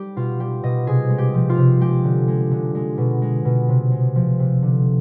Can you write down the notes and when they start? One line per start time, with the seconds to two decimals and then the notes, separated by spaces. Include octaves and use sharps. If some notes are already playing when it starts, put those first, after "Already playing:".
Already playing: G3 G4
0.16 B2 F4
0.40 G3 G4
0.63 B2 D#5
0.87 C3 G#4
1.10 G#3
1.18 G4
1.34 F3
1.50 F4
1.57 C3
1.80 G#3 G4
2.04 D3
2.28 G#3
2.51 D3
2.75 G#3
2.98 B2
3.22 G#3
3.45 B2
3.69 C3
3.91 G#3
4.16 F3
4.39 C3
4.62 D3